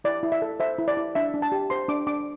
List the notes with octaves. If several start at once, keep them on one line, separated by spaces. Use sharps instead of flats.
E4 D5
E4
E5
A4
C5 E5
E4
D5
E4
D4 E5
D4
A5
G4
C5 C6
D4 D6
D4 D6